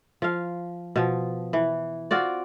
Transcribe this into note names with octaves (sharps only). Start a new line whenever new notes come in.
F3 F5
B2 F3
E3
C4 F4 F#4 D5